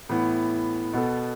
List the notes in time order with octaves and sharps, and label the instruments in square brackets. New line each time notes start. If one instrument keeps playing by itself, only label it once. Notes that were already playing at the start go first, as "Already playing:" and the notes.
[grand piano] A2 E3 B3
B2 B3 A4